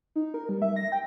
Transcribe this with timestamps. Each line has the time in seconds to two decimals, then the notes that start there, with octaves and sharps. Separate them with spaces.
0.16 D#4
0.34 A#4
0.49 G3
0.62 E5
0.76 A#6
0.92 G5